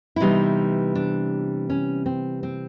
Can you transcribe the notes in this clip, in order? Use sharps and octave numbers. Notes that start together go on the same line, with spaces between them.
E4
C3 E3 G3 B3 D#4
D4
C#4
C4
C4